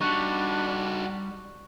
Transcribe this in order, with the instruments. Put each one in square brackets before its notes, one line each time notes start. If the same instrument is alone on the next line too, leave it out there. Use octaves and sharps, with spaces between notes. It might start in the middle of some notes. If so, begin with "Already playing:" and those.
[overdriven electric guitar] G3 [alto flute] D4 [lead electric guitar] D#4 F#4 [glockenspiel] C#6 F#6